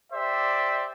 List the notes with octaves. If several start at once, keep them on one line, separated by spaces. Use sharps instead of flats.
G4 C5 D5 E5